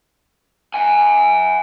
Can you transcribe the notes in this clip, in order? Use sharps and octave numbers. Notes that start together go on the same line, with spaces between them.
F#5 G#5